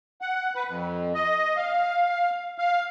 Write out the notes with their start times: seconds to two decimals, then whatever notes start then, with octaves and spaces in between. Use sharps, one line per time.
0.21 F#5
0.56 B4
0.68 F2
1.15 D#5
1.57 F5
2.58 F5